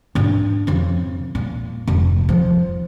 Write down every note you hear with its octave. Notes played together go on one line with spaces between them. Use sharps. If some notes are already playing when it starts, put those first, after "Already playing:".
G#2 D4
F2 C#3
A#2
F1 G#2
F3